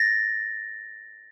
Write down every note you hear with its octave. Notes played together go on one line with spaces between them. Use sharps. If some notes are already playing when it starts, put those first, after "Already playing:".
Already playing: A6 A#6